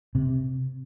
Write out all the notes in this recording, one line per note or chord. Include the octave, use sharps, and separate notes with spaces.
C3